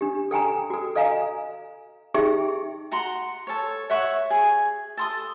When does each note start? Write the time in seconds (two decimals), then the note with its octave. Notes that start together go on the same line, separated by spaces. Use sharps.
0.01 D4 G4
0.31 A4 G5 G#5 A#5
0.70 F#4 A4
0.95 A4 D#5 F5 G#5 A#5
2.14 D#4 G4 G#4 E5 G5 C#6
2.91 F#4 F#5 A#5 C6
3.47 A4 C#5
3.90 C#5 E5 F#5 C#6
4.30 G#4
4.97 A4 C6 D#6